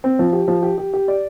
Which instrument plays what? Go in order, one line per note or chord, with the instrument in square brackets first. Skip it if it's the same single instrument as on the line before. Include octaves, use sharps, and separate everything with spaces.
[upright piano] C4
F3
G4
F3
G4
G4
G4
D5